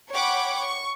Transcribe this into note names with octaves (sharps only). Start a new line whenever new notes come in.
C#5 F#5 G5 B5 C#6 D6
C#6